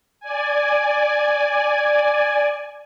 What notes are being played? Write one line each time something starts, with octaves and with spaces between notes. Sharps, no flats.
D5 G#5